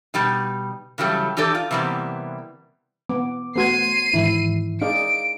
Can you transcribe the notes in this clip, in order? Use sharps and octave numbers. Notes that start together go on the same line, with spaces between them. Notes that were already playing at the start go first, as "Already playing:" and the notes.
B2 G3 D#4
C#3 E3 F#3 G3 A3
E3 D#4 G4 A4 D5
F4
C3 E3 G3 A#3 B3
B3 D6
A3 B3 F#4 C6 G#6 C7 D#7
G#2 D#3 E3 E4
D#4 G#4 D5 F5 D7